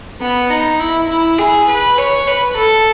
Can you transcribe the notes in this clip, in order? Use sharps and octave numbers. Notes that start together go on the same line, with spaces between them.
B3
D#4
E4
E4
G#4
B4
C#5
B4
A4